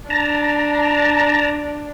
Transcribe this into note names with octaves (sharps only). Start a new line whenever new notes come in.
D4 A5 A#5